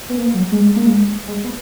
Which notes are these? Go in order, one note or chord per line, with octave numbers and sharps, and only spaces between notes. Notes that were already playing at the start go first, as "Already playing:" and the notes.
B3
A#3
F#3
G#3
A#3
G#3
G#3
B3